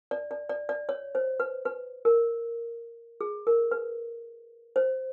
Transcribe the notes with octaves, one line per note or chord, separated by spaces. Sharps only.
D5
D5
D5
D5
C#5
C5
B4
B4
A#4
G#4
A#4
B4
C5